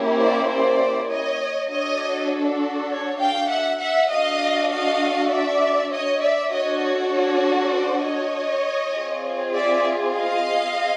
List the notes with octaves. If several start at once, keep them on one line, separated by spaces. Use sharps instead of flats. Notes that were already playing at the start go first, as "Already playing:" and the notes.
Already playing: A#3 C#4 E4 G4
C5 D5
C5 D5
C#5 D#5
D4 F#4 A4 C#5 D#5
C#5
F5 G5
E5 F#5
E5 F#5
D4 F#4 A4 D#5 F5
D#5 F5
D5 E5
C#5 D#5
D5 E5
D4 F#4 A4 C#5 D#5
C#5
C#5
C5 D5
C#5 D#5
C4 F4 G#4
D5 E5
D#5 F5